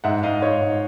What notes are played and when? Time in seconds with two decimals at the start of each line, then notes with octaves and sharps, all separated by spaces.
0.04 G#2 E5 F#5
0.23 G#2 D#5 F5
0.42 G#2 C#5 D#5
0.61 G#2